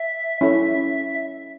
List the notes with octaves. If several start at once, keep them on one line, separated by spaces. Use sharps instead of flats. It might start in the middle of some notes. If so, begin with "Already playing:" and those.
Already playing: E5
C#4 E4 A4 E5